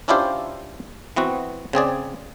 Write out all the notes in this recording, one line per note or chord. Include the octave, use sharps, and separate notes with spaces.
C#4 D4 E4 F4 G4 C5
E3 B3 C4 F#4
C#3 C4 G#4 D5